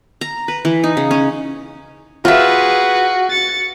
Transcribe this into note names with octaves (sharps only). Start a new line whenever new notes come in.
A#5
B4
E3
D#4
C#3
C#4
F4 F#4 G#4 B4 E5
A6 C#7